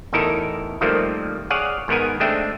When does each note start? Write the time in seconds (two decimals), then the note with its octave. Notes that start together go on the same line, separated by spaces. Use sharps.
0.13 A1 E2 D#4 E4 A4 A#4
0.81 D#3 F3 G3 A3 A#3 C4
1.50 G#4 C#5 D5 F5 F#5
1.88 G#2 D#3 B3 A#4 G#5
2.20 G#3 A3 C4 D4 E5 G5